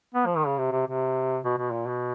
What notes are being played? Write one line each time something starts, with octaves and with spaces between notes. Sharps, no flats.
B3
F3
D#3
C#3
C3
C3
C3
B2
B2
A#2
B2